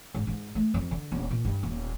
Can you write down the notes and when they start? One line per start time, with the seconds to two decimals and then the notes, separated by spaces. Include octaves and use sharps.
0.15 G#2
0.27 G#2
0.55 A3
0.74 F2
0.91 D3
1.12 D#1
1.31 A#2
1.45 G2
1.63 D#1